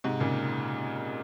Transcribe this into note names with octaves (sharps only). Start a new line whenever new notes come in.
G#2 C3
A#2 C#3